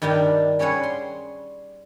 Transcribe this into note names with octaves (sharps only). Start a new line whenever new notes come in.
G2 D#3 G3 D4
G3 C#4 G#4 B4 C#5 F#5
C6